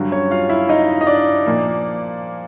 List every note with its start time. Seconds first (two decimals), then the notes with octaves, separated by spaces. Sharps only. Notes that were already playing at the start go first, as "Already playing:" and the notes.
Already playing: G2 D3 F#3
0.12 C#4 C#5
0.31 F4 F5
0.49 E4 E5
0.69 D#4 D#5
1.01 D#5
1.07 D4 D5
1.46 A#2 F3 A#3